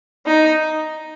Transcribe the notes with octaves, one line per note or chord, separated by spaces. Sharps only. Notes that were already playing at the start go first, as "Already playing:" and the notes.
D#4